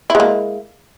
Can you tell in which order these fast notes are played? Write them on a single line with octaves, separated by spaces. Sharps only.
E4 G#3 A#3